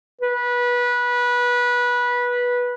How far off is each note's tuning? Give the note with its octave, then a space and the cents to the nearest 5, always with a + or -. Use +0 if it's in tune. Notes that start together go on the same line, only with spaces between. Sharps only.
B4 -20